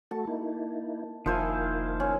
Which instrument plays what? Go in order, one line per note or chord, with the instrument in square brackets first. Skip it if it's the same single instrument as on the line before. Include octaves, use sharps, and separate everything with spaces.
[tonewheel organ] A3 F#4 A4 [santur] A5
[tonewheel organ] A#3 D#4 E4
[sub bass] F1 [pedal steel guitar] D#3 E4 [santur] F3 C5 G#5 [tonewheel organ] A#3 F5
[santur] C#4